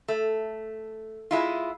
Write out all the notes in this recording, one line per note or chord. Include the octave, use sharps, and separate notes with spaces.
A3
G#3 E4 F4